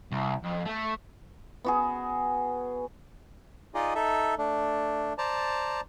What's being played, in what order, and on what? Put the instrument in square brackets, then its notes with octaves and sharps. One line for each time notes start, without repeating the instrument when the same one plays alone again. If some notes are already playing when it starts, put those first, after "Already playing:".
[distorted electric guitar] C2
F2
A3
[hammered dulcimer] B3 F#4 G#4
[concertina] D#4 F4 G#4 D5 D#5
D#4 A4 E5
A3 D4
C5 D5 A5 A#5